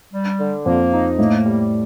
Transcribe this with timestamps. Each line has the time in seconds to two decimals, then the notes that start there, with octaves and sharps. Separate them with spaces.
0.13 G3
0.39 D3
0.66 F2 A#3
0.92 D#4
1.18 A2 A#3
1.46 G3